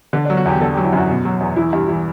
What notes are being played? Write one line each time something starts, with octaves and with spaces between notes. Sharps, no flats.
D3 D4
D4
F#3
F#4
E2 G4
D3 A4
G4
F#3
E4
F#2 F#4
B2
F#3
E2
E3 E4
G2
E3